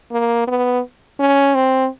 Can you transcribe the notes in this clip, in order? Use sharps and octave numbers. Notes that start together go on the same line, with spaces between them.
A#3
B3
C#4
C4